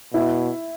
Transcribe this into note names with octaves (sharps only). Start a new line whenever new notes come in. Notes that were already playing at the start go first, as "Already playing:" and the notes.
B2 E4